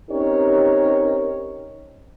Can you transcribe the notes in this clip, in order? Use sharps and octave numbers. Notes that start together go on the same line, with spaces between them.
C4 C#4 D#4 G4 A#4 C#5